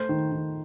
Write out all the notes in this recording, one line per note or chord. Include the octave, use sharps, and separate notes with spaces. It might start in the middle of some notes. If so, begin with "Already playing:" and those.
Already playing: A3 C5
D#3
D#3